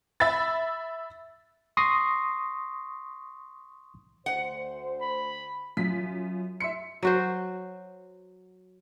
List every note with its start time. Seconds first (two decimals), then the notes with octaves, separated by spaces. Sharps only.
0.20 E5 B5 A6
1.77 C6 C#6 D#6 A#6 C7
4.26 D2 C5 F#5
5.02 B5
5.77 F#2 F4 B6
6.60 E5 C6 C#7
7.03 F#3 F#4 C5